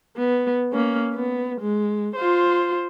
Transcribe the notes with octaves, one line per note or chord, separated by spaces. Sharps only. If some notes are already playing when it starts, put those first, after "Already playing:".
B3
A#3 C#4
B3
G#3
F4 C5